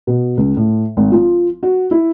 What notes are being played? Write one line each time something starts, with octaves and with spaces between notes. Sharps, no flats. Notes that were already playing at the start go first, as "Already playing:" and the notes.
B2
C#2
A2
G#1
F3
F#4
E4